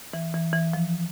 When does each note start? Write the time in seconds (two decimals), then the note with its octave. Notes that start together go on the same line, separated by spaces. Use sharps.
0.14 E3
0.34 E3
0.53 E3
0.73 F3